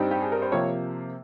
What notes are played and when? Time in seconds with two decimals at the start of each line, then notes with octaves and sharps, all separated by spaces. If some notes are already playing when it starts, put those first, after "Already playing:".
Already playing: G2 G3 C4 D#4 G5
0.11 G4
0.22 G#4
0.32 A#4
0.42 C5
0.52 C3 F3 A#3 C#5